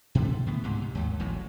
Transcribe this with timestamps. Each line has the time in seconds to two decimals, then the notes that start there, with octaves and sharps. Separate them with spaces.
0.15 B2 D3 E3 A3
0.46 A2 D3 B3
0.64 C#2 G#2 C3
0.82 C3
0.95 D#2 G#2
1.20 E1 A1 A2 F#3